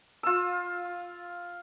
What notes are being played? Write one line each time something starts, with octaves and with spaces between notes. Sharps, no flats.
F4 E6